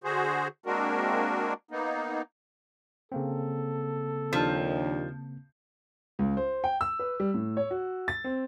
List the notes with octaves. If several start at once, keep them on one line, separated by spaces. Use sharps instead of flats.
D3 F#4 G#4 C5
G#3 A#3 C4 D4 F#4 A#4
A#3 B3 D#4
C#3 A#3 C4 A4
D#2 F3 D4
C#2
C5
G5
E6
B4
G3
A2
C#5
F#4
A6
C4